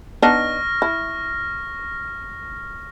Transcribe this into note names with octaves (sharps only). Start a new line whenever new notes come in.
B3 D4 D#4 C#6 F6 A#6
E4